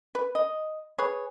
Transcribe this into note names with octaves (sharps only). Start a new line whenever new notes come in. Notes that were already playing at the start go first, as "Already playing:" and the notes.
B4
D#5
G#4 B4 C#5